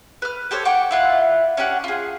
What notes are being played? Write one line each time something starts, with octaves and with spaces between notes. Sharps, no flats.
B4 F6
G4 A4 C5 C#5
F#5 G5 C#6 D6
E4 F4 F#5
C#4 D4 G4 F#5
F4 G#4